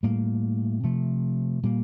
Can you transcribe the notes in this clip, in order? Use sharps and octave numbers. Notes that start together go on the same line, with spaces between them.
A2 G3 A#3
C3 F3 A3
A#2 G3 A#3